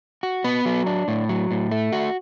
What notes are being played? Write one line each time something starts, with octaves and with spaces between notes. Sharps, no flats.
F#4
B3
F#3
D4
A2
F#3
A2
A3
F#4